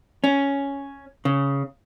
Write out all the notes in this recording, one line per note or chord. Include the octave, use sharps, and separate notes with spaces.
C#4
C#3